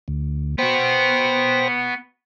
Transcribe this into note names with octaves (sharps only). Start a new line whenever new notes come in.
D2
B3 F#4 C5 G5 A#6